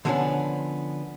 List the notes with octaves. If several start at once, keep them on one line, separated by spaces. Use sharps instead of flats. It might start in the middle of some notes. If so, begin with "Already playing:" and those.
D3 F3 A#3 B3 C#4 D4